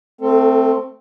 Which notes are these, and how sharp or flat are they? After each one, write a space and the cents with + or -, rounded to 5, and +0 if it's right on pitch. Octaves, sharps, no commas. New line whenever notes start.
A3 +0 C4 +0 A4 +35